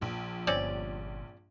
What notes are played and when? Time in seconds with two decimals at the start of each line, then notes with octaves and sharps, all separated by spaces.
0.01 A#1 A#2 F3
0.47 G1 C4 C#4 D5